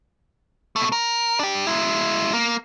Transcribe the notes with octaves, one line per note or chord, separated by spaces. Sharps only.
B2 A3
A#4
D4 G4
G#3 E4
A#3